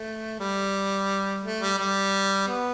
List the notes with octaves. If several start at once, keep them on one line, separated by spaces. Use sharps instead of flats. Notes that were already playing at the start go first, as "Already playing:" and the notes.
Already playing: A3
G3
A3
G3
G3
B3